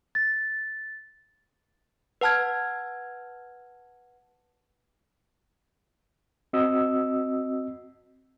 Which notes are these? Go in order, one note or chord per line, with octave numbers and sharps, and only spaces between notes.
A6
B4 F#5 A5 F6 G#6
C4 F#4 D#5 E6